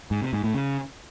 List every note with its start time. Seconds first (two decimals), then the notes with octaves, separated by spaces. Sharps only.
0.11 G#2
0.22 C3
0.33 G#2
0.44 A2
0.55 C#3